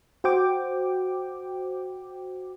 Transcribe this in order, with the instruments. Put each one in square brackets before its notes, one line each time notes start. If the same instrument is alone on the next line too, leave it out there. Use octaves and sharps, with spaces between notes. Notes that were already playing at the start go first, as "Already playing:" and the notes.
[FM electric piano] F#4 C5 G5 D6